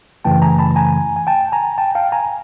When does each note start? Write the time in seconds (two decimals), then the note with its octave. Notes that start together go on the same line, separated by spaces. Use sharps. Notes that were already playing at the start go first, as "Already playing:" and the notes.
0.25 F#2 C#3 E3 A3 G5 A5
0.42 G#5 A#5
0.59 A5 B5
0.76 G#5 A#5
1.16 G#5
1.27 G5 A5
1.52 G#5 A#5
1.78 G5 A5
1.95 F5 G5
2.12 G#5 A#5